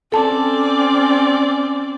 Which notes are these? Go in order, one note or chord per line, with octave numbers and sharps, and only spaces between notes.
C4 C#4 A4 D5 A5